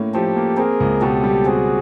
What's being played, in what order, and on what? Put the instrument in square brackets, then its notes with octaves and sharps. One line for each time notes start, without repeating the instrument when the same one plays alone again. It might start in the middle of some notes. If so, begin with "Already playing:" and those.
Already playing: [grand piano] A2 A#3 C#4
[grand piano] F3 [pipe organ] G4 A4
[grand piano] A#3
[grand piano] C4 [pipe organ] G#4 A#4
[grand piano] C#2
[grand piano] B2 [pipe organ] G4 A4
[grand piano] G3
[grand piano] C4 [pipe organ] F#4 G#4